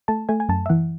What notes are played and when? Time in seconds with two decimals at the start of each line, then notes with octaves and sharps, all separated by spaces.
0.08 A3 A5
0.29 A3 G#5
0.40 G#5
0.49 F#2 A5
0.66 E5
0.69 E3 F#5